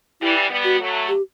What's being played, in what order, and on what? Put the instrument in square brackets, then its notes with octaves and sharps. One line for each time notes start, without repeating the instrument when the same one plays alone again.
[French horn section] E3 G3 [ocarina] E4
[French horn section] G3 B3
[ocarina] F#4
[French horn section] F#3 A3
[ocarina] G4